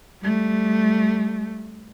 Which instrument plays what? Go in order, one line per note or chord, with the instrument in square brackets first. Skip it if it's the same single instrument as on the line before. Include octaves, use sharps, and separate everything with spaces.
[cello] G3 A3